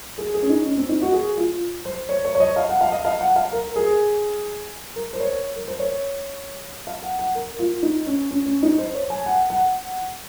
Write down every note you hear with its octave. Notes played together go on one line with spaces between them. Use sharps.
G#4
G#4
C#4
D#4
C#4
C4
D#4
F#4
G#4
F4
C5
C#5
C#5
C#5
D#5
F5
F#5
F5
D#5
F5
F#5
F5
A#4
G#4
A#4
C5
C#5
A#4
C5
C#5
F5
F#5
F#5
A#4
F4
D#4
C#4
C#4
C#4
D#4
C5
C#5
G#5
F#5
F#5